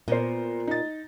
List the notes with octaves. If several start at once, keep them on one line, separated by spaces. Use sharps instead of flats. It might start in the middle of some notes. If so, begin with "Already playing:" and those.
A#2 B3 A#4 C5
D#4 A6